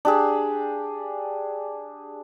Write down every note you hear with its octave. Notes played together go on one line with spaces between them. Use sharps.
D4 G4 G#4